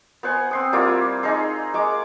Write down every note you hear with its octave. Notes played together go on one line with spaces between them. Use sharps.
B3 C5 F#5 G#5
C4 C6 D#6
G3 A#3 E4 F4
D#4 G#4 A#5 C6
G#3 C#6 D6